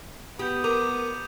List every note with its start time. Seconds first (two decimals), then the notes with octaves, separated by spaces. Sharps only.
0.39 B3 G4 D#6 G6
0.64 A#4 D6 D#7 F7